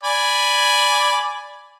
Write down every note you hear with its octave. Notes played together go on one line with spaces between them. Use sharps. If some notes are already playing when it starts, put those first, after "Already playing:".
D5 G#5 B5